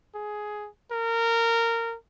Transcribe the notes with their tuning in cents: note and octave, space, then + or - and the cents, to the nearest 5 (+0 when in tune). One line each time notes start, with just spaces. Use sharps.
G#4 +10
A#4 -20